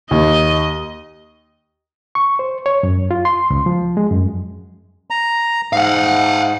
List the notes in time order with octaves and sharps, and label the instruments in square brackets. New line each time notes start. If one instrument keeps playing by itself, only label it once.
[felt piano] D#2 [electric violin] D#5
[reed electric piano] C#6
C5
C#5
F#2
F4
C6
C#2
F3
G#3
F#2
[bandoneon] A#5
[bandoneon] G#2 [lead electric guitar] F5 F#5